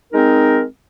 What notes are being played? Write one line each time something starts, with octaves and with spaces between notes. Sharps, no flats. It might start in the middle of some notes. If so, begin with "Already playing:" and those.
G#3 C4 D#4 A#4